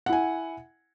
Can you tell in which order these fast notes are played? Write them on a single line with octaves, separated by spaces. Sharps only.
F#5 E4 G#5